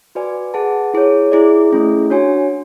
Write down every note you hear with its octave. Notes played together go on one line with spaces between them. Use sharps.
F#4 B4 D5 G#5
G#4 B4 F#5 A5
E4 G#4 C#5
E4 G#4 D5
A3 C#4 E4 G#4
D4 F#4 C#5 G#5